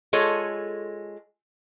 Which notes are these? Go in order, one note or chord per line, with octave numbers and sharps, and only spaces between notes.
G#3 F4 A4 C#5 G#5